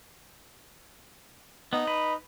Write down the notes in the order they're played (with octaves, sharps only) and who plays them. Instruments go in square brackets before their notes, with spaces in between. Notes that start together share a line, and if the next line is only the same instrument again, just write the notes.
[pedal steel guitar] B3 [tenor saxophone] D#4
[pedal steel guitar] B4